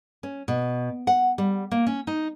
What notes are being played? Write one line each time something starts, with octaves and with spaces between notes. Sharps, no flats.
C#4
B2
F#5
G3
A#3
C#4
D#4